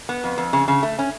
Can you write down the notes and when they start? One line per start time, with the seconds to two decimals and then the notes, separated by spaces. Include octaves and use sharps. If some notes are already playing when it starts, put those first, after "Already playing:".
0.09 B3
0.24 F2
0.38 F2
0.53 C#3
0.68 C#3
0.83 A3
0.99 C#4